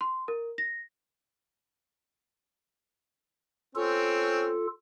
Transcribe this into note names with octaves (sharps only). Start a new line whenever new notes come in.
C6
A#4
A#6
C4 C#4 F4 A4